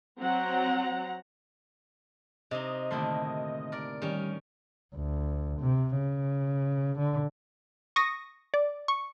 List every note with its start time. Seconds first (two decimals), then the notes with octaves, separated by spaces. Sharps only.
0.19 F#3 C4 F#5 A#5
2.51 C3 D#4 D#5
2.90 D#2 A2 D3 D#3 E4 C6
3.72 A#4 D5
4.02 D#3 G3 C#4
4.95 D2
5.60 C3
5.97 C#3
6.99 D3
7.96 C#6 D#6 A#6
8.54 D5
8.88 C#6